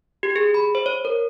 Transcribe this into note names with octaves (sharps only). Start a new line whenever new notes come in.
G4
G#4
B5
C5
C#5
A#4